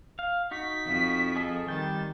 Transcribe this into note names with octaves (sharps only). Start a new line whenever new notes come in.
F5
D#4 F#4 B6
F2 F3
G#4 A4 D#5
D#3 G3 G5 A6